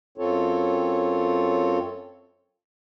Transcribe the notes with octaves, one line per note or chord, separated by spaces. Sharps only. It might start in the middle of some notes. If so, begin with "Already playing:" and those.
F#2 C4 F4 A4 C#5